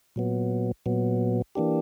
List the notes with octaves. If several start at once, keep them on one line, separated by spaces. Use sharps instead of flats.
A#2 F#3 B3
A#2 F#3 B3
E3 A#3 D4 G4